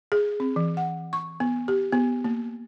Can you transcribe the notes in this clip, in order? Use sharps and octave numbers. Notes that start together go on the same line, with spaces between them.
G#4
C4
E3
F#5
C#6
B3
G4
B3
A#3